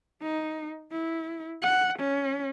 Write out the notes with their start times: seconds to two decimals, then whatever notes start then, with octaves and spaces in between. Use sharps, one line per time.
0.22 D#4
0.92 E4
1.62 F#5
1.99 C#4